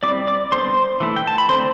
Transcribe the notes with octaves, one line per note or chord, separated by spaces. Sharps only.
G3 C4 E4 D5 D6
D5 D6
D3 G3 B3 D4 C5 C6
E3 A3 E4
G5
A5
B5
D3 A3 C4 C5 C6